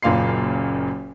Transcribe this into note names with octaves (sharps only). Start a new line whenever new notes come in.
F#1 F#2 A#2 F5 C6 C7